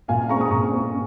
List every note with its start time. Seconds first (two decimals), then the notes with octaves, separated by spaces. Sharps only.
0.08 A#2 F5 G#5
0.29 G#3 C4 A#5 C#6
0.41 D#6
0.51 A#2 A#5 C#6
0.72 G#3 C4